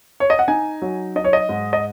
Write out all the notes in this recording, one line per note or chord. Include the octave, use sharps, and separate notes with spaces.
C#5
D#5
F#5
D#4 G#5
F#3
D#4 D#5
C#5
D#5
G#2
D#5